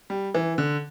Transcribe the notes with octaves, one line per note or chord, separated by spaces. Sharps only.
G3
E3
D3